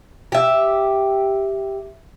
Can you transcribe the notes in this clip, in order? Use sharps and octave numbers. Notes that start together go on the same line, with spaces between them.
G4 E5